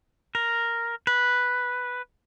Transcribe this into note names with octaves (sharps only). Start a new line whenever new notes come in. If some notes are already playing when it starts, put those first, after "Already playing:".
A#4
B4